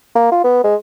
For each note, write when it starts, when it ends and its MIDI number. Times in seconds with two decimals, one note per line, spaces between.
0.15 0.31 58
0.32 0.40 65
0.44 0.63 59
0.64 0.75 56